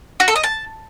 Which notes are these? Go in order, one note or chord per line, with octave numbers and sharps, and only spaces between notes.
F#4
A4
D#5
A5